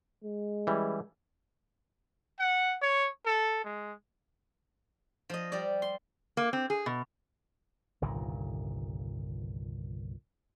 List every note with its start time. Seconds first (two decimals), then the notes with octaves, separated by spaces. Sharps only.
0.24 G#3
0.67 E3 G3 C#4
2.39 F#5
2.82 C#5
3.26 A4
3.64 G#3
5.29 F3 D#5
5.52 G3 D5
5.82 C6
6.37 A#3
6.53 C4
6.70 G#4
6.86 B2
8.02 G1 C2 A#2 D#3